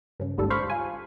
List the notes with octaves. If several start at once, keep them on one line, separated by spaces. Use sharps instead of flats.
G2 C#3
G1 D#2 G#2 G3 A4
C5 F5 B5 C#6
F4 G#5